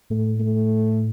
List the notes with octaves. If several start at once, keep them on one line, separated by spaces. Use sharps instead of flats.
A2 A3
A3